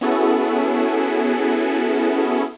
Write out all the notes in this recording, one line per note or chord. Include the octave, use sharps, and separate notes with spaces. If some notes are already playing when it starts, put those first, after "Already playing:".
B3 C#4 E4 F#4 G#4 A4